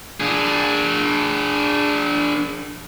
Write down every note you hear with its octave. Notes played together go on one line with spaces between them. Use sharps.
D4 G#4